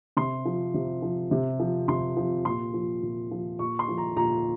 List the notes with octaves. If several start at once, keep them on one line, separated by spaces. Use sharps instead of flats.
C3 C6
F3
C3
F3
C3
F3
C3 C6
F3
A#2 C6
F3
A#2
F3
A#2 C#6
C6
F3
A#5
A#2 A#5